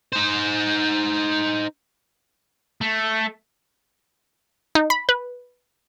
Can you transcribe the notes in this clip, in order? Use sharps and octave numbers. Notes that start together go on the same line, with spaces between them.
D#4 C5
A3
D#4
B5
B4